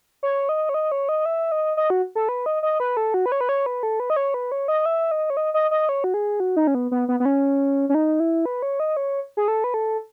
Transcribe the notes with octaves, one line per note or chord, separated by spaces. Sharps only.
C#5
D#5
C#5
D#5
C#5
D#5
E5
D#5
D#5
F#4
A4
B4
D#5
D#5
B4
A4
F#4
B4
C#5
B4
C#5
B4
A4
B4
D#5
C#5
B4
C#5
D#5
E5
D#5
C#5
D#5
D#5
D#5
C#5
F#4
G#4
F#4
D#4
C#4
B3
B3
B3
B3
C#4
C#4
D#4
E4
B4
C#5
D#5
C#5
G#4
A4
B4
A4